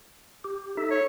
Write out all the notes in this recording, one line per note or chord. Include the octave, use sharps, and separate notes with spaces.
G4
D#4 A4 E5
C#5